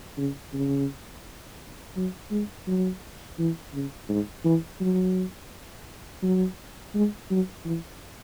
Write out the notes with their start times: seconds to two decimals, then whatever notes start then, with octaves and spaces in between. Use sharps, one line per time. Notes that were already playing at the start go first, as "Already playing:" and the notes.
0.18 C#3
0.54 C#3
1.97 F#3
2.31 G#3
2.67 F#3
3.39 E3
3.74 C#3
4.09 G#2
4.45 E3
4.81 F#3
6.23 F#3
6.95 G#3
7.31 F#3
7.65 E3